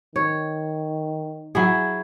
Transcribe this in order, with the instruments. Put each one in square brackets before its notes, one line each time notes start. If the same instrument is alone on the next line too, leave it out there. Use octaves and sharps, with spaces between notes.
[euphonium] D#3 [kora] C#5
[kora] F#3 E4 G#4